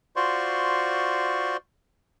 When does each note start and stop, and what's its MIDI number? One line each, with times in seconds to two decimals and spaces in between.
0.16 1.57 65
0.16 1.57 66
0.16 1.57 72
0.16 1.57 74
0.16 1.57 84
0.16 1.57 85